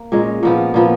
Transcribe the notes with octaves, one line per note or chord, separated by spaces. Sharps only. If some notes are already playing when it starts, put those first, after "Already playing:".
Already playing: A#3
A#2 G#3 C#4
A#2 F3 B3
A#2 F3 B3